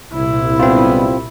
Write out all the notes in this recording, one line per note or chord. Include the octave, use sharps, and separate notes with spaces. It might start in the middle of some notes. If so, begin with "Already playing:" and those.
C2 A#2 E4
D3 G#3 B3 C4 F4